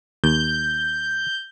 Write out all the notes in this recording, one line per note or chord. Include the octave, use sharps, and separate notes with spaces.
D#2 G6